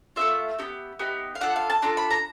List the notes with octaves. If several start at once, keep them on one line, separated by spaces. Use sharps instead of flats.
A3 D4 F4 E5
B3 D#4 G4
B3 D#4 G4
F5
D4 F4 A4 F#5
F5
A5
D4 F4 A4 A#5
B5
A#5